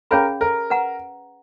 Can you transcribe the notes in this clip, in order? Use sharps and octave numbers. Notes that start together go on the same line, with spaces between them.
C#4 G#4 A#4 C#5 F5 B5
A#4
B4 F#5 A#5